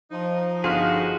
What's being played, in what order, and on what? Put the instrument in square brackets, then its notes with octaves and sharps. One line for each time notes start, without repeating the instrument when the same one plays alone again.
[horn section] F3 D#4
[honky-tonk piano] G1 F6 B6 [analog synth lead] F4 [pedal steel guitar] F#4 G#4